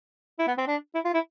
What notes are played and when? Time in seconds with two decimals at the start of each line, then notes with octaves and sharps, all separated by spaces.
0.39 E4
0.47 B3
0.58 C4
0.67 D4
0.94 E4
1.05 F4
1.14 E4